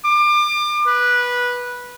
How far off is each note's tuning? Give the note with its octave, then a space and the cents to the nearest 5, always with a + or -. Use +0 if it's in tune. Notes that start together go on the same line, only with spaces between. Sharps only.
D6 +30
B4 -10